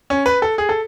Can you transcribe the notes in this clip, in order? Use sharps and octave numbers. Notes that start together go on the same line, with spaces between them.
C#4
B4
A4
G#4
A4